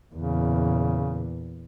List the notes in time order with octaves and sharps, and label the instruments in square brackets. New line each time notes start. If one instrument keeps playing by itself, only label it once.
[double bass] E2 A#2 [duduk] C#3